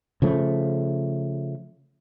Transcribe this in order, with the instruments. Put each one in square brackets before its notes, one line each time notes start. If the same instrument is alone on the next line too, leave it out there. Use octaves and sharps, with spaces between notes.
[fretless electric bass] C#3 F3 A3